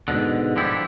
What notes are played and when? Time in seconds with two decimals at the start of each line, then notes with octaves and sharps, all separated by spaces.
0.08 G#2 B2 D3
0.56 D3 F3 G3 E4 G4